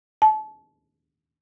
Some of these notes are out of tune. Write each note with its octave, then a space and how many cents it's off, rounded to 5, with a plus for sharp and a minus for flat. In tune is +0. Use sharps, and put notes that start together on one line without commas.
A5 -30